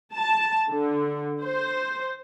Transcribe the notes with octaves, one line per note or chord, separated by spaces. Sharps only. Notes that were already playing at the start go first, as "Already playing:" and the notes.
A5
D3
C5